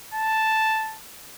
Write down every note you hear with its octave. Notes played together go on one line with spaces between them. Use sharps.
A5